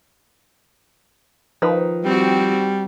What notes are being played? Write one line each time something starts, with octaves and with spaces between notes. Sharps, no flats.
D#3 F3 D#4 B4
G3 C4 F#4